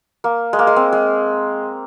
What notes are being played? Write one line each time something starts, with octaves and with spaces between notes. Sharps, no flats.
A#3
G#3
A#3
G#3
C4
G#3